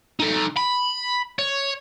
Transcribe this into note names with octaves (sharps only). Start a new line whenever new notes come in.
D#4 A4
B5
C#5